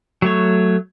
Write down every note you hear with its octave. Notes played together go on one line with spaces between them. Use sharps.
F#3 A3 C#5